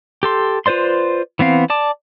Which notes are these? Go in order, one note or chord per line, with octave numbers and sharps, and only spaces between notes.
G4 A4 C6
F4 B4 C5 D5 C6
E3 B3 C4 F5
D5 A5 D6